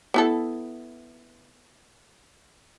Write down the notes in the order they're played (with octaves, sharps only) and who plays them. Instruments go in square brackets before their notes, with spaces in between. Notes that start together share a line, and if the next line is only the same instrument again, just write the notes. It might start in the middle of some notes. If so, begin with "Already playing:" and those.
[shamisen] B3 E4 A4